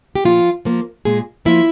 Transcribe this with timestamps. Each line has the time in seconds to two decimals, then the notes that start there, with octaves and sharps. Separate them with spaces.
0.15 G4
0.24 A#2 F3 F4
0.65 F3 A#3
1.05 A#2 G#3 G#4
1.45 F3 A#3 E4 E5